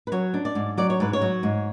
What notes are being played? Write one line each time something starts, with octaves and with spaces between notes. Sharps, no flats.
B4
F#3 C#5
D4
D5
G#2
F#3 D5
C#5
G#2 B4
C#5
F#3
G#2